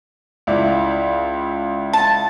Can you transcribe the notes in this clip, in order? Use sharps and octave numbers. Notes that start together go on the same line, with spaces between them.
C#2 E4 D5
A5